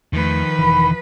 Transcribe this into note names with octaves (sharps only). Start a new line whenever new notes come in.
E2 D#3 F3 A3 B4
E1 B1 E3 B5